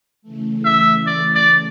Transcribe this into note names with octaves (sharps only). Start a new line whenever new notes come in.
C#3 E3 A3
E5
D5
D5